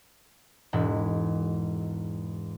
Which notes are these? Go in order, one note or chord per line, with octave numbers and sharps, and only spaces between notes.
E1 G#2 E4